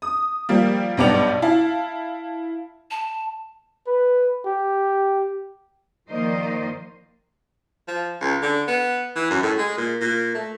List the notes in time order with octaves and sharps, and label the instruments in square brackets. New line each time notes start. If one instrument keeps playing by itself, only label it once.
[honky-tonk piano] D#6
F3 G3 A#3
B1 G2 B3 G4 D5 F7
E4 F5 A5
[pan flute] A5
[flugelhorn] B4
G4
[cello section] D#3 F3 A#3 C5 D5 D#5
[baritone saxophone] F3
C#2
D3
B3
E3
F#2
A2
G#3
A#2
A#2
A3